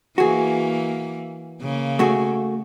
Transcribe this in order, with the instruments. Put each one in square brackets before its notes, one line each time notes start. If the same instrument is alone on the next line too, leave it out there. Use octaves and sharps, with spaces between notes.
[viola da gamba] E3 A#3 [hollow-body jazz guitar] F#4 G#4
[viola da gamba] C#3 A#3
[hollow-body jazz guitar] A3 F#4 G#4